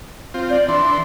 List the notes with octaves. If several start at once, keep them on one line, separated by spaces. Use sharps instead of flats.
C4 F4
D5
E3 D4 C6